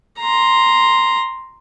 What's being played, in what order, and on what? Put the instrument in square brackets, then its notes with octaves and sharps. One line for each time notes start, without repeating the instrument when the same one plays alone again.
[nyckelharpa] A#5 C6